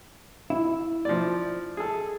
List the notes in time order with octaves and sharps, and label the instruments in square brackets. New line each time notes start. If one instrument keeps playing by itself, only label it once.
[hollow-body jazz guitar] E4
[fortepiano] F3 D5
G#4 A4